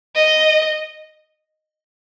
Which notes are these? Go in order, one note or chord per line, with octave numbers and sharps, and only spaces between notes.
D#5